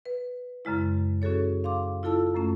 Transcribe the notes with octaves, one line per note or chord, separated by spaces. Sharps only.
B4
F#2 C#3 G#3 E4
C#4 F#4 G#4 A4 C#5
F5 C6 D6
E4 F4 A4 A5 E6
F#2 A3 C#4